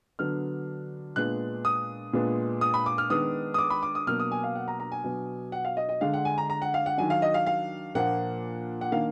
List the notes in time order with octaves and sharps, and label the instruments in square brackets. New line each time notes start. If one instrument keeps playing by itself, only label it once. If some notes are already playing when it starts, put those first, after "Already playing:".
[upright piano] D3 F#3 B3 D4 F6
A#2 G#3 B3 D4 F#6
D#6
A#2 G#3 B3 D4
D#6
B5
D6
F6
D#3 G#3 B3 D4 D#6
D#6
D6
B5
D6
D#6
B2 F#3 A#3 D4 F6
D#6
G#5
F5
F#5
A#5
A#5
G#5
B2 F#3 B3 D4
F#5
F5
D#5
D#5
D3 G#3 D4 F5
F#5
G#5
A#5
A#5
F#5
F5
F#5
D#3 F#3 D4 G#5
F5
D#5
F5
F5
A#2 F3 A#3 D4 F#5
F#5
D#3 A#3 D4 F5